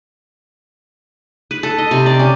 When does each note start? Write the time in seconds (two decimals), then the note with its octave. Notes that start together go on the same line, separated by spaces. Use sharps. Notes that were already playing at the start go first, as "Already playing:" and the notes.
1.51 B4
1.63 A4
1.79 D#5
1.91 C3
2.06 D5
2.19 C#4